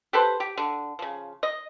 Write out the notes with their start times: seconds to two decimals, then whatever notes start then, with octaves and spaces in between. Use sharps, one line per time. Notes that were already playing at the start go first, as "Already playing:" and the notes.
0.13 G4 A4 B4 C5
0.40 G4
0.57 D3
0.99 C#3 F3
1.43 D#5